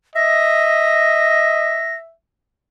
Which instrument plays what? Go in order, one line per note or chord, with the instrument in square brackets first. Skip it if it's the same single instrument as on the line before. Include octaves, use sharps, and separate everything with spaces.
[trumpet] D#5 [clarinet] E5 [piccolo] A#6